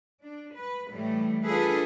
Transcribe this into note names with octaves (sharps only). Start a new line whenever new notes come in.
D4
B4
A2 E3 G3 A3
D4 F4 G#4 A4 B4